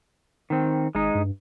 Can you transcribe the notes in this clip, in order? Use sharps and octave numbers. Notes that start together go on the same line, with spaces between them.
D#3 C4
G#1 G#3 D#4
G2